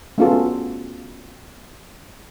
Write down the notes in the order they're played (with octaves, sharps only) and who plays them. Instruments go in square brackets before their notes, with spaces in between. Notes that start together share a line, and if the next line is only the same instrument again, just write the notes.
[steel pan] A3 B3 C#4 F4 F#4 A4